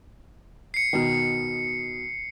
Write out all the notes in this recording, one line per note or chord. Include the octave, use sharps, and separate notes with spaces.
C7 C#7
B2 D#3